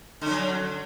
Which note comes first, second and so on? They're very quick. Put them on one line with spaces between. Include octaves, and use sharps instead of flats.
D3 C#4 F#3